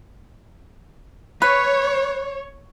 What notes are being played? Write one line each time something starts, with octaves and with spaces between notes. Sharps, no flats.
B4 C#5